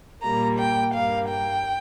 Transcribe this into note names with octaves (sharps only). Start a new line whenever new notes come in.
A#2 G3 A#3 A#5
G5
G2 G3 A#3 F5
G5